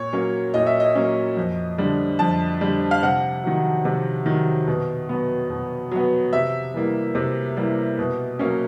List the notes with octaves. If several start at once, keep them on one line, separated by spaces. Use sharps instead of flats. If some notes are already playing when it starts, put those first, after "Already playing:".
Already playing: A#2 C#5
F#3 A#3 C#4
A#2 D#5
E5
D#5
F#3 A#3 C#4
F2
D3 G3
F2 A5
D3 G3
F5
C3 F#5
D#3 F#3
C3
D#3 F#3
B2
F#3 B3
B2
F#3 B3
C3 E5
E3 G3 A#3
C3
E3 G3 A#3
B2
F#3 A#3 C#4